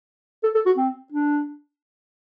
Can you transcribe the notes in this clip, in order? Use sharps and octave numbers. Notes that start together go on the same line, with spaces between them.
A4
A4
F#4
C4
D4